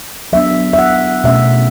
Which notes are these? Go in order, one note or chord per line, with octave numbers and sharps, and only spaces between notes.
F#3 B3 D4 E5
E5
F#5
B2 A3 C#4 E5